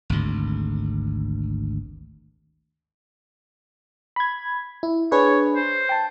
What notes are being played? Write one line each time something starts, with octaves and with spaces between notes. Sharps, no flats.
G#1 D2
B5 G#6
E4
D4 G#4 B4 C#5
C5
G5 A5